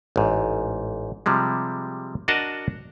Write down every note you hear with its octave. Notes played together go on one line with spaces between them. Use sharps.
A1 G#2
C3 F3 G3 G#3
D4 F#4 A#4 D#5 F#5 A5